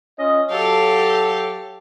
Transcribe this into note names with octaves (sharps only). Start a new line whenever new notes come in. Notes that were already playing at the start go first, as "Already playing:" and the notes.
C#4 F4 D#5
F#3 G4 A4 F5